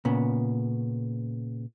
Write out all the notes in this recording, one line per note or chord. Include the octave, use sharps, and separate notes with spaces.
A#2 C#3 B3